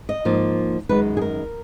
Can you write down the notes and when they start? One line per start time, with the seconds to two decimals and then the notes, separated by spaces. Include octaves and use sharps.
0.09 D#5
0.25 G#2 F3 A#3
0.89 F#2 D#3 G#3 B4
1.17 G#4
1.22 A#4